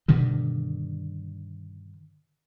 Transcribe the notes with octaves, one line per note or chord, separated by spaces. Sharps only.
G2 B2 D3 D#3